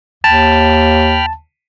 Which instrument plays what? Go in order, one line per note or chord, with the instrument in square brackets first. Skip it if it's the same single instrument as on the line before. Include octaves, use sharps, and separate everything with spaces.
[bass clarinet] D#2 [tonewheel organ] G5 B5 F6 [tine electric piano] A5